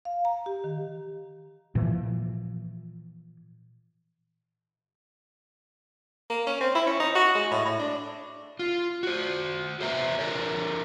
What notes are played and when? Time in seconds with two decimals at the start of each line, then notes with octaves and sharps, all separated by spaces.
0.05 F5
0.25 A#5
0.46 G4
0.64 D#3
1.75 A#2 E3 F3
6.30 A#3
6.47 C#4
6.61 C4
6.75 E4
6.87 C#4
7.00 D#4
7.15 F#4
7.35 G#3
7.52 A2
7.65 A2
7.79 D4
8.59 F4
9.03 F#4 C5
9.80 A4 B4 C5 E5 A#5
10.19 D3 A4 A#4 C#5